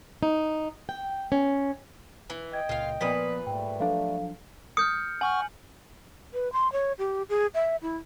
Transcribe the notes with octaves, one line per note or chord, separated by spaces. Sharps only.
D#4
G5
C#4
E3
D#5 G5 G#6
C#2 A#2 F4 F5
A#2 F3 B3 B4 D5 D#6 B6
G#2 G3 A3 G5
F3 F#3 D4 A4 F5
D#6 F6 G6 C#7
F#5 G#5 C#6 F6 F#7
B4
C6
C#5
G4
G#4
E5
E4